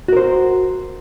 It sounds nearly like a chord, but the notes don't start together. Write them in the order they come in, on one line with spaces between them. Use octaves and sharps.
F#4 A#4 C5